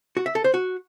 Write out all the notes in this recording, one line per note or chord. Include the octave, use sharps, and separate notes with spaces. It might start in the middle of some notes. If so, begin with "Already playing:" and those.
F#4
E5
A4
C5
F#4